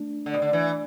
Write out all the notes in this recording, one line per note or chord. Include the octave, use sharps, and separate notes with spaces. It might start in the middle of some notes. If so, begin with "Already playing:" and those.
Already playing: A3 D4
D3
B2
D3
E3